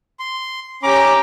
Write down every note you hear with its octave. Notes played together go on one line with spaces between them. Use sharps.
C6
C#4 G4 A#5 D6